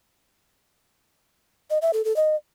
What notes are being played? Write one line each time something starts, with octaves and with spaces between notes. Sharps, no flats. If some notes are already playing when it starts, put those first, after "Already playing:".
D#5
E5
A4
A4
D#5